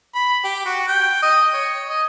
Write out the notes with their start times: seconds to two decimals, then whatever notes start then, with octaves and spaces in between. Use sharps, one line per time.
0.15 B5
0.44 G4
0.66 F#4
0.88 G5
1.22 D#5
1.53 C#5
1.89 D#5